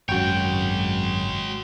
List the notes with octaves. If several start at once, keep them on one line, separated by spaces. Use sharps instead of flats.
G#1 F#2 G#3 F#4 C#5 G5